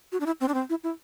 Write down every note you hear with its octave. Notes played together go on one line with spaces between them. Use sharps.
F#4
D4
E4
C4
D4
C4
E4
E4